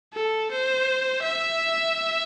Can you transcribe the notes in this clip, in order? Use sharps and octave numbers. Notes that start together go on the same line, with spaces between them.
A4
C5
E5